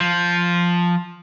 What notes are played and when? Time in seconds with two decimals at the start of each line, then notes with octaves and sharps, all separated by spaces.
0.01 F3